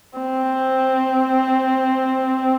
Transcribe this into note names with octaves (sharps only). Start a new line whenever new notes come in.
C4